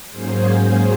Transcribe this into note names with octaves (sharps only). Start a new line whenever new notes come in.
G#2 F#3 A#3 C#4 G#4 C5
G#4 C5